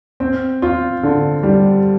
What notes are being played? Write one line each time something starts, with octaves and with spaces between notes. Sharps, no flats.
C4
F4
D3
G3